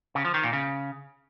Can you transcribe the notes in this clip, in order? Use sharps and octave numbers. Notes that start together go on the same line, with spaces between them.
C#3
F3
D#3
A#2
C#3